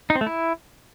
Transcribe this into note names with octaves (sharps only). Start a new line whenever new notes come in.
D#4
C4
A3
E4